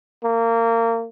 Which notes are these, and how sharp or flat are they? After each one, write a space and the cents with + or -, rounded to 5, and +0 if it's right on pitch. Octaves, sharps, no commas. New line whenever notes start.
A#3 -25